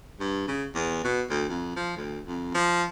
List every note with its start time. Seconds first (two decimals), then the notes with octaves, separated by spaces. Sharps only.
0.20 G2
0.48 C#3
0.75 E2
1.04 B2
1.30 D2
1.49 F2
1.76 F3
1.96 D2
2.26 F2
2.54 F3